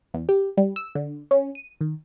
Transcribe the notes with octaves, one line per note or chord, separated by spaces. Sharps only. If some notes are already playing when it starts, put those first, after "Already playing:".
E2
G4
G3
E6
D3
C#4
D#7
D#3